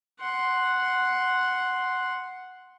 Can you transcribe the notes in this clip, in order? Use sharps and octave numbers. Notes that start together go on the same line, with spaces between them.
F#5 C6